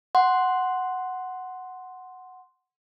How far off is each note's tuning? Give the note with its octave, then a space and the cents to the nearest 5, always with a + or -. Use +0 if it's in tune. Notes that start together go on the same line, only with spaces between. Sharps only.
F#5 +0 C6 +0